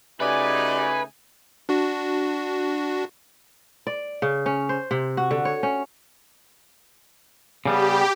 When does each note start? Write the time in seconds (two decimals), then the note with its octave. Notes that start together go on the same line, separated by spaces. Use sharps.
0.20 C#3 A3 D#4 F#4 G4 B4 D5 G#5
1.69 D4 F#4
3.87 D5
4.22 C#3
4.46 C#4
4.69 C5
4.91 C3
5.17 F#4
5.31 D3
5.45 C#5
5.63 C#4
7.66 C#3 G3 B3 G4